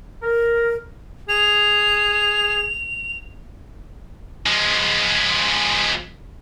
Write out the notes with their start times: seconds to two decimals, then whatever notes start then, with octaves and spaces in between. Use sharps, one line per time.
0.23 A#4
1.29 G#4 F7
4.46 F3 G#3